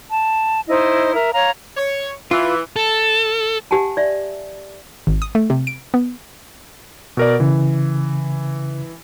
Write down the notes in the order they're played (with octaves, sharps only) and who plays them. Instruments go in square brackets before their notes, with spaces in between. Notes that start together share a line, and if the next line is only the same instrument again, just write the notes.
[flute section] A5
D#4 E4 C5 D#5
A#4 E5
C#5 F5 A#5
[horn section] C#5
[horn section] E3 [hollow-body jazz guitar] F4
[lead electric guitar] A4
[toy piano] G4 F#5 G#5 A5
D5 E5
[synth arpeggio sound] G#1
D#6
A3
C3
D7
B3
[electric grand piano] B2 A#4 D5
[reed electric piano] C#3 [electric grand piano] E3